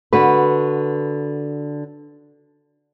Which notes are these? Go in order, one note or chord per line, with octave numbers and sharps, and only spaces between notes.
D3 F#4 B4